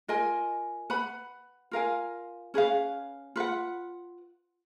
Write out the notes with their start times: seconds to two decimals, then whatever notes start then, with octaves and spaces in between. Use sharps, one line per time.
0.08 F4 A#4 D#5 G#5
0.90 B4 F#5 B5
1.71 F4 A#4 F5 G#5
2.54 C#4 G#4 B4 F5
3.36 F4 B4 F#5